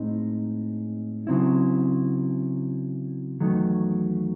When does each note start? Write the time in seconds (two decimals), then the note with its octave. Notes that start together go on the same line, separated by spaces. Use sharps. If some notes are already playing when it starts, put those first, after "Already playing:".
Already playing: A2 G#3 C4 D#4
1.27 C#3 F#3 C4 E4
3.40 E2 D#3 F#3 A3